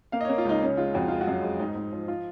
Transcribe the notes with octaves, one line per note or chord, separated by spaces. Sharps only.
A#3 F5
D#5
A#3 C#5
F4
C#2 D#4
C#3 C#4
G#3 F4
F2 F#4
G#3 F4
F#4
F#2
G#3
G#2 D#4
G#2
F3
F3 F4